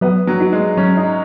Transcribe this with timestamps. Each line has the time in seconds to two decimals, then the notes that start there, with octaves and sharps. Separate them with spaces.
0.01 F#3 B3
0.27 F#3
0.40 D#4 F#4
0.52 G#3
0.77 F#3 C#4
0.97 D#4